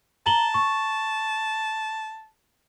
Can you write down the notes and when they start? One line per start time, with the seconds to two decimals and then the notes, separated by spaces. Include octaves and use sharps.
0.26 A5 A#5 F#7 G7
0.54 C#6